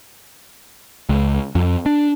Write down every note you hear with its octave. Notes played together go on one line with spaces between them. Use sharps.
C#2
F2
D4